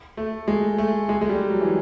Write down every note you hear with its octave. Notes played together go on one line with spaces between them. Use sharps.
A3
G#3
A3
G#3
G#3
G3
F#3
E3